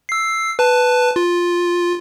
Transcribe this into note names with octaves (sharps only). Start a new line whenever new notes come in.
E6 C7
B4 A5
F4